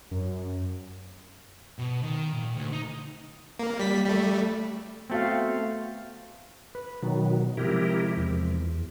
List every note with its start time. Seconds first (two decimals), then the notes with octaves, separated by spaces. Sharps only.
0.11 F#2
1.79 B2
2.03 D#3
2.33 A#2
2.55 D2
2.72 D#4
3.59 A#3
3.79 G3 B6
4.05 G3 A3
5.10 A3 B3 C4 F#4 F5
6.75 B4
7.02 B2 D#3 F#3
7.57 C3 F3 G#3 E4 G4 A#4
8.17 E2